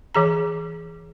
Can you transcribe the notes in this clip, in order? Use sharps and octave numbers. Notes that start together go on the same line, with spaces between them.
E3 G#4 A#5